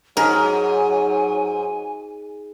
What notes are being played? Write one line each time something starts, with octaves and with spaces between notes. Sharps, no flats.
G#2 F#3 A#4 G#5